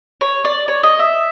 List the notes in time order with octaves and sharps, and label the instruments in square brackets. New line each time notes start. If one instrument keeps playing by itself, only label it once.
[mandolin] C#5
D5
C#5
D#5
E5